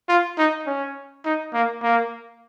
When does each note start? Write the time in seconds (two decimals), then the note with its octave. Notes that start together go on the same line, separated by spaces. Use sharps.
0.09 F4
0.38 D#4
0.66 C#4
1.25 D#4
1.53 A#3
1.82 A#3